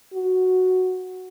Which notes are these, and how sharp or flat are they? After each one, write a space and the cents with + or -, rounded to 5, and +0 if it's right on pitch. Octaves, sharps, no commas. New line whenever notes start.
F#4 +0